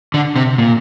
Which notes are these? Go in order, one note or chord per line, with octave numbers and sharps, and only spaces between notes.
D3
C3
A#2